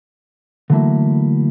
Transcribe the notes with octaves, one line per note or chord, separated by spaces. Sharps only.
D3 E3 F#3 A3 A#3 E4